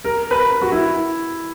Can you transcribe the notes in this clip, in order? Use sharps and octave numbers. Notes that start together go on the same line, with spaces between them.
A#4
B4
A#4
F#4
E4